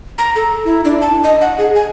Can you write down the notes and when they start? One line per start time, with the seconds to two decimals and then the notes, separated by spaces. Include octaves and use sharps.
0.18 A#5
0.36 A4
0.65 E4
0.85 D4
1.01 A5
1.24 D#5
1.41 F#5
1.58 G#4
1.75 G#5